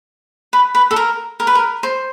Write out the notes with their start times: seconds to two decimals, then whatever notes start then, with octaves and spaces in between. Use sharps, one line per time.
0.53 B4
0.75 B4
0.91 A4
0.96 A#4
1.40 A#4
1.47 B4
1.55 A#4
1.83 C5